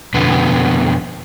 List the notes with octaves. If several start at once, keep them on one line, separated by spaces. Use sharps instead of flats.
F2 B2 D3 B3